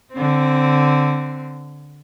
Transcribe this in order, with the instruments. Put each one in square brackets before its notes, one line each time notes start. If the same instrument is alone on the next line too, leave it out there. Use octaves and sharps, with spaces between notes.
[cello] D3 C4